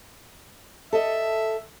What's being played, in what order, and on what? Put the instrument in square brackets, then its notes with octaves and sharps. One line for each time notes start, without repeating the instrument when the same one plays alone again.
[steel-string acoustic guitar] A4 D#5 [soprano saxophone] E5